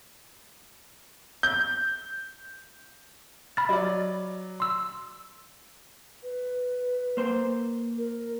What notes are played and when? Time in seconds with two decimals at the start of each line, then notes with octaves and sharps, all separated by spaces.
1.43 G6
3.57 B5 F6 A6
3.69 F#3 D5 D#5
4.60 C6 E6
6.23 B4
7.17 A#3 C5
7.98 A#4